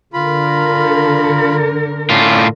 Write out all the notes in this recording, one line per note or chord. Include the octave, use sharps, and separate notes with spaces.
D3 F4 A#4 B5
A2 C#4 F4 D5